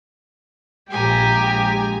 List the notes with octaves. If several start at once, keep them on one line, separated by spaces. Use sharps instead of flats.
A#1 G#3 G4 G#5 A#5